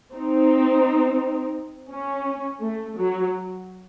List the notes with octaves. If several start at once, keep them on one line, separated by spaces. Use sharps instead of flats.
C4 D#4
C#4
A3
F#3